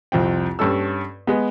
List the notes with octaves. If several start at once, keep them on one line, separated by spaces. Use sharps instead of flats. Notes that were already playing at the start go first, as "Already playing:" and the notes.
C2 F2 C4 G5
G2 C#4 A4 E6
G#3 B3